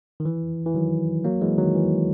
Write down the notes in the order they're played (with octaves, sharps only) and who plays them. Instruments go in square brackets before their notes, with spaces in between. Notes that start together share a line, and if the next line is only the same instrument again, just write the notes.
[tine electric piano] D#3
E3
E3
D#3 F#3
F#3 A#3
E3 G#3
D#3 F#3
E3